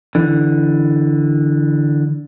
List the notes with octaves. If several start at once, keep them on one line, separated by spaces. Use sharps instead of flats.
D3 E3